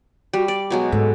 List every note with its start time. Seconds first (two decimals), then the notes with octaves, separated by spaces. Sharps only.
0.33 G3 F#4
0.48 D5 D6
0.70 B2 F#3 G#3 F#4
0.92 G#2 A4